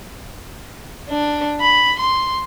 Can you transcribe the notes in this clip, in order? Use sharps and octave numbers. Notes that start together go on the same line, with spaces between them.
D4
B5
C6